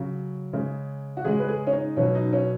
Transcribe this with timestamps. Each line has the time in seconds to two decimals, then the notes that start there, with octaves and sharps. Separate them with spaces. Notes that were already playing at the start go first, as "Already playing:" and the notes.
Already playing: C#3 F#3
0.53 C#3 G#3
1.17 F#4
1.24 C#3 G#3 G#4
1.39 B4
1.48 G#4
1.67 C#4
1.73 D#4
1.97 B2 F#3 C#4
2.15 D#4
2.33 C#4